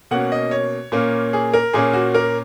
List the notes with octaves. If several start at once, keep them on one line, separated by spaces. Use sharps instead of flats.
B2 A#3 C#4 F#5
D#5
C#5
A#2 A#3 C#4
G#4
A#4
A#2 A#3 C#4 G#4
F#4
A#4